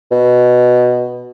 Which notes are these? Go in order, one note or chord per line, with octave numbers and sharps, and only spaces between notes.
B2